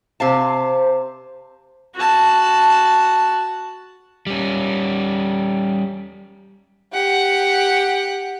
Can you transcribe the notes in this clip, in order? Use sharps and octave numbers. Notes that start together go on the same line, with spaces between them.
C3 C5 F5 A5
F#4 A5
G3 C#4
G4 F#5